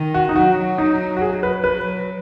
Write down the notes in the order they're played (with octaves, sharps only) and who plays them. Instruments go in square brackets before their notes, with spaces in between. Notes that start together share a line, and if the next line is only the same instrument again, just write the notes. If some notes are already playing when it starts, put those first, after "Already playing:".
Already playing: [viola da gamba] D#3
[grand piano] F#4
D#4
[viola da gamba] F#3 [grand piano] F#4
[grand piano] D#4
F#4
G#4
B4
[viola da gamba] F#3 [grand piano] B4